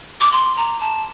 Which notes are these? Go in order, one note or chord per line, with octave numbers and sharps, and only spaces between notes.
D6
C6
A#5
A5